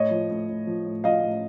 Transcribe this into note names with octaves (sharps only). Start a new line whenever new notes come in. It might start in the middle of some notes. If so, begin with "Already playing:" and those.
Already playing: A2 C#5 D#5
F3
A2
A2
F3
A2
F3 D#5 F5
A2